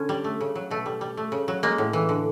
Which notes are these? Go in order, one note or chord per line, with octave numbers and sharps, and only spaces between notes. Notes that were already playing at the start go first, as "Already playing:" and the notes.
Already playing: D3 C#4
G3
A3
C#3
F#3
B2 A3
G3
G3
A3
C#3
F#3
G#3 A#3
A2
E3
D3